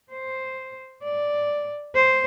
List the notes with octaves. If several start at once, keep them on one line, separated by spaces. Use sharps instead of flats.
C5
D5
C5